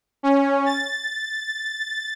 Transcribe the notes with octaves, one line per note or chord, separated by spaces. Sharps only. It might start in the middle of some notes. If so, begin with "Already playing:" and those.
C#4
A6